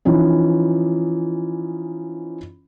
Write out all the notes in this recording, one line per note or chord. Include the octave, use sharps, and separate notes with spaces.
E3 F3 C#4 D#4